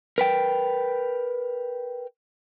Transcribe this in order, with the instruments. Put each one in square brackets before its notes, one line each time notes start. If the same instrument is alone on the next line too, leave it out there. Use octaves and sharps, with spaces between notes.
[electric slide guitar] A#4 B4 G5